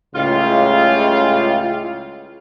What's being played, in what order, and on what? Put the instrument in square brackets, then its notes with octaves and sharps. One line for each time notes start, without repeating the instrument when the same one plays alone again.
[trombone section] C#2 A2 C#3 [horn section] G3 G#3 F4